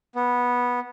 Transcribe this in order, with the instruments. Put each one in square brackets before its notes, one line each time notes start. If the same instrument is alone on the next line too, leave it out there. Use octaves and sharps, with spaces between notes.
[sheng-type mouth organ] B3